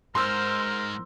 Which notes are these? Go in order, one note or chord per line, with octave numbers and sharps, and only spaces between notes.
G#2 A#4 C5 C6 E6 F6